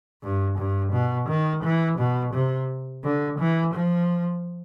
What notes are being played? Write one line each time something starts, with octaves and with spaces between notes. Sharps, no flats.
G2
G2
B2
D#3
E3
B2
C3
D3
E3
F3